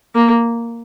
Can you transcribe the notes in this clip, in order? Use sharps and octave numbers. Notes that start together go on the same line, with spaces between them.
A#3